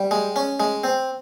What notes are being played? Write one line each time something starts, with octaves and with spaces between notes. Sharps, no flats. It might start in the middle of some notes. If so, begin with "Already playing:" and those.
Already playing: G3
G#3
C#4
G#3
C4